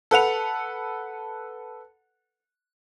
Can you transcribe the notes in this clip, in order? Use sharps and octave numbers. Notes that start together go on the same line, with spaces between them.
A4 B4 F#5 F7